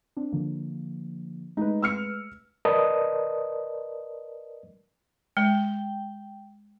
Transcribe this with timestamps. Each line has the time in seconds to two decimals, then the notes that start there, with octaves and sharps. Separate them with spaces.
0.17 C4 D4
0.32 D3 F3 A#3
1.57 G#3 A3 D#4 B4
1.82 E6 F6 C#7
2.65 A#4 B4 D5 D#5 A5 D#6
5.37 G#3 G5